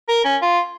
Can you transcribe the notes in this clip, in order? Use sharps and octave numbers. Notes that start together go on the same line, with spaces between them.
A#4
C#4
F4